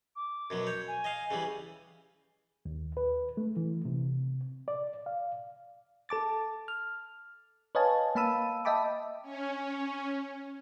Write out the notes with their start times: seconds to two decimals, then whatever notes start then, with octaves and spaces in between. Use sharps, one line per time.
0.16 D6
0.50 F#2 B2 F#3
0.67 C#5 G6
0.88 G#5
1.04 D#5 F5
1.31 C#3 E3 G3
2.65 D#2
2.97 B4
3.37 A3
3.57 E3
3.85 C3
4.68 D5
5.06 F5
6.09 A4 A5 D6 A6
6.68 F6
7.75 B4 C#5 D#5 F5 G#5 A5
8.15 A#3 F5 A5 B5 E6 D#7
8.65 D#5 E5 G5 A5 B5 D6
9.22 C#4